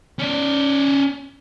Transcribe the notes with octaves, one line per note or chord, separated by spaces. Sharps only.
C#4 D5